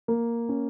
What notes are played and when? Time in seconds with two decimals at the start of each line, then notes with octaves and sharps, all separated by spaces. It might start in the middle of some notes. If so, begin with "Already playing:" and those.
0.08 A#3
0.49 C#4